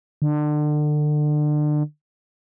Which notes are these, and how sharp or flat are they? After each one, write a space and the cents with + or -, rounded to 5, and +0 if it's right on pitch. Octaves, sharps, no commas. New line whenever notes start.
D3 +30